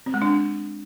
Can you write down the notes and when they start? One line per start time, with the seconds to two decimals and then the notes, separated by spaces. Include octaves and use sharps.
0.06 C4
0.14 G#3
0.22 D4